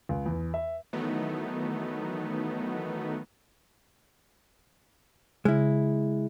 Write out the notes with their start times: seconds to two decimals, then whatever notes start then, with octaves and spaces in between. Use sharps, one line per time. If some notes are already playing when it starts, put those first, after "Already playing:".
0.09 C#2
0.26 E2
0.54 E5
0.93 D#3 E3 F#3 A3 B3 D#4
5.45 C#3 G#3 E4